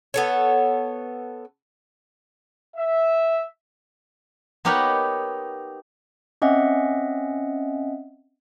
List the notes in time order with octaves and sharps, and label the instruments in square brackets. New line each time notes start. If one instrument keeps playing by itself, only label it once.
[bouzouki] B3 A4 C#5
[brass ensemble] E5
[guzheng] B3 D#4 G4 A#4 C#5 F#5
[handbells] C4 C#4 D#5 E5 F#5